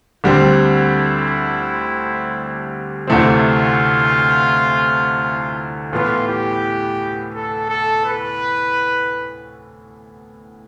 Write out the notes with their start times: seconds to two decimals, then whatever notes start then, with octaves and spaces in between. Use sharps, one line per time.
0.24 D2 D3 G3 C4 E4
3.07 D2 C3 E3 A3 C4 F4
5.92 A2 E3 B3 F4
6.27 G4
7.34 A4
7.70 A4
8.05 B4